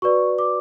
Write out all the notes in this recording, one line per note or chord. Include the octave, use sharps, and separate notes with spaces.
F#4 B4 D5 C#6
D6